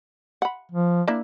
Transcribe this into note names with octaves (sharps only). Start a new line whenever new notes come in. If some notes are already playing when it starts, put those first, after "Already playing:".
F#5 B5
F3
A#3 D4 E4